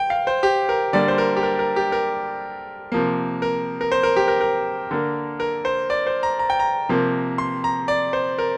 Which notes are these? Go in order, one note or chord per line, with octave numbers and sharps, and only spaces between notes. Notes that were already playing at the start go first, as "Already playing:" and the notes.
Already playing: G5
F5
C5
G4
A#4
D3 G3 A#3 D5
C5
A#4
G4
A#4
A#4
G4
A#4
C3 F3 A#3
A#4
A#4
C5
A#4
G4
A#4
A#4
D3 A#3
A#4
C5
D5
C5
A#5
A#5
G5
A#5
C3 F3 A#3
C6
A#5
D5
C5
A#4